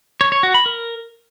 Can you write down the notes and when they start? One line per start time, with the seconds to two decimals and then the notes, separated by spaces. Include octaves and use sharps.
0.21 C#5
0.32 C#5
0.43 F#4
0.54 B5
0.66 A#4